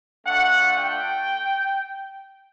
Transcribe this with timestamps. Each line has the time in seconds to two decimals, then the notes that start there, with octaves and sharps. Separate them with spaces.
0.25 A3 D4 F4 F#5
0.78 G5